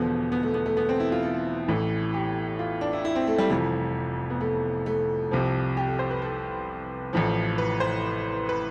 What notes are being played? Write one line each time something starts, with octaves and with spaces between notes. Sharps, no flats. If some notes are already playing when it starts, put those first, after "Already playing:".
Already playing: E1 E2 D3 F3 B3
B3
A3
B3
A3
B3
C4
E4
F4
A4
A1 A2 E3
G4
F4
D4
E4
E4
C4
A3
G3
F1 F2 E3 A3
B3
A3
A3
C2 C3 F3
G4
A4
C5
B4
A4
A1 A2 F3
B4
C5
B4